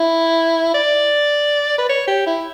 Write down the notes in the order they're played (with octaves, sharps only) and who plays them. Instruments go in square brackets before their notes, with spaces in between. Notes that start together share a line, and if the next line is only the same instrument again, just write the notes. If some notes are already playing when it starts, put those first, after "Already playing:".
Already playing: [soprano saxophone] E4
D5
B4
C#5
G4
E4